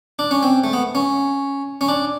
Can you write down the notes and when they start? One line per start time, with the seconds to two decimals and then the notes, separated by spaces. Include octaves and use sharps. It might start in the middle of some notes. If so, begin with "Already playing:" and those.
0.19 D4
0.31 C#4
0.43 C4
0.64 A3
0.73 B3
0.95 C#4
1.81 C#4
1.88 D4